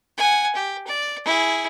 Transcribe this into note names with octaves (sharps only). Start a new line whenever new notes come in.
F#5 G#5
G4
D5
E4 G#4